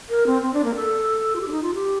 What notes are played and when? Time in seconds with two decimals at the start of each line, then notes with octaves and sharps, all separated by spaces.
0.10 A#4
0.27 C4
0.42 C4
0.54 D4
0.65 A#3
0.75 A4
1.36 F4
1.41 G4
1.48 D4
1.52 D#4
1.63 F4
1.75 G4